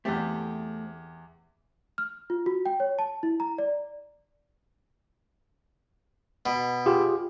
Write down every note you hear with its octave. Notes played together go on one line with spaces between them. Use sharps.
E2 A3 C4 G4 A4
F6
F4
F#4
G5
C#5
A5
E4
A#5
D5
B2
F4 G4 G#4